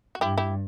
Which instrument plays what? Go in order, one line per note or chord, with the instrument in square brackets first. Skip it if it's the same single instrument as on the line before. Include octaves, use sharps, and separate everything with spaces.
[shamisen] F#4
[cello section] G2 [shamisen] E4 G4
[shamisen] E4 G4